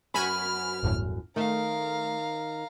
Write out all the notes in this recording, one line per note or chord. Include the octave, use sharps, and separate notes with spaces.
F#2 F#4 G#5 B5 F6
G1 E2 A2
D#3 A3 F5 A#5